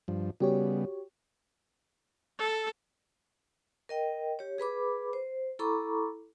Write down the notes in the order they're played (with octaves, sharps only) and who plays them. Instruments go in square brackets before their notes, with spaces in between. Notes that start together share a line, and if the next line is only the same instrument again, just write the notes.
[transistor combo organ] G2 F3
[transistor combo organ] C#3 G3 B3 [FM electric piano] F#4 G4 C#5
[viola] A4
[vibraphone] A#4 D#5 G5
G4 C#5
G#4 B4 B5 D6
C5
E4 A4 A#5 B5 C#6 D6